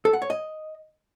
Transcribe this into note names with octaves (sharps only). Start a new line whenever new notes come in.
A4
F#5
C#5
D#5